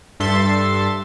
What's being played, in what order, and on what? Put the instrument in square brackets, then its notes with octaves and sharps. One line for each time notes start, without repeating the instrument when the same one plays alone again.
[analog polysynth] G2 A4 E5 C6 A6